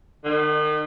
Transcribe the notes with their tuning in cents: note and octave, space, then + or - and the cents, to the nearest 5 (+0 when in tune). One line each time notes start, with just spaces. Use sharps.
D#3 -40